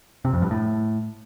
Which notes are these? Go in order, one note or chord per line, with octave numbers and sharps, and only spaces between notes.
C3
F2
G2
A2